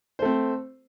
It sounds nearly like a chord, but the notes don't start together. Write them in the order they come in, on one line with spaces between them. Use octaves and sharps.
C5 A3 C4